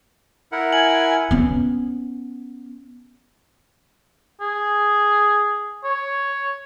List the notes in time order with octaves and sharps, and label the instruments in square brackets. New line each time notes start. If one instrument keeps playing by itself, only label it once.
[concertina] E4 A#4 F#5
[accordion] G#5 [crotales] F#7
[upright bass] B3 C#4
[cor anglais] G#4
C#5